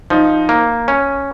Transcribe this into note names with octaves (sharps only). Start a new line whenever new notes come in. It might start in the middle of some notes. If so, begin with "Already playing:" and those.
F3 D#4
A#3
C#4